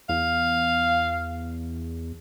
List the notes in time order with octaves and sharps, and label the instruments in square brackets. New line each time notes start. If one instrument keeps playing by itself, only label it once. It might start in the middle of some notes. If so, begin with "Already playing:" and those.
[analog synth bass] E2 [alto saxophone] F5